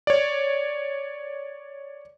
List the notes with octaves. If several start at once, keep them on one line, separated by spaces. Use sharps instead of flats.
C#5 D5